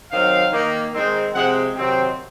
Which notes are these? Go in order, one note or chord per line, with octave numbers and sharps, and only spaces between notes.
D#3 F#3 C4 F5
D#3 A#3
D#3 G#3 C4
C3 F3 G#3 C4 F#5
C3 D#3 F#3 C4